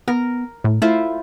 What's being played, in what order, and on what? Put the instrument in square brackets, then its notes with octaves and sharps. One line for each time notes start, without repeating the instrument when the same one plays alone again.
[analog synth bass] B3 [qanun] A#4
[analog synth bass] A2
[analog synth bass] A3 [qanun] E4 F4 C5